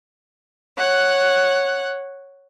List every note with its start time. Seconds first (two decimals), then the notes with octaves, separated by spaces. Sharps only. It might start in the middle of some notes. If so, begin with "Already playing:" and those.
0.77 C#5 F#5 F#6